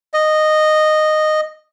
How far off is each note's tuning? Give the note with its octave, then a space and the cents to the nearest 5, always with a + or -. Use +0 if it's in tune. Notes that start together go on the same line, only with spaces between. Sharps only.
D#5 -10